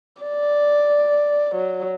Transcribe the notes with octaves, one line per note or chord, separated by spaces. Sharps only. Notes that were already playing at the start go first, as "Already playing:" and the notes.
D5
F#3